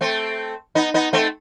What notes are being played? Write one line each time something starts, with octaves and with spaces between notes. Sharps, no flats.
A3 C4
B3 D#4
B3 D#4
A3 C4